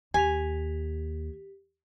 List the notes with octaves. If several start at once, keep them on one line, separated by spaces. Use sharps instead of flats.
D#2 G4 G#5 B6 F7